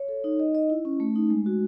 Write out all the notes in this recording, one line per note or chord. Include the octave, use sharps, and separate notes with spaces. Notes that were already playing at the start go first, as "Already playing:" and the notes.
Already playing: C#5
A4
D#4
D#5
D#5
E4
C#4
A3
D#4
G#3
F#4